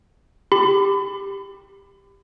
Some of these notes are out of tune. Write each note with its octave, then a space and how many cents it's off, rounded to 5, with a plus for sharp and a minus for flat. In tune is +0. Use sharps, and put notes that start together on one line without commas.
G4 +10 B5 +35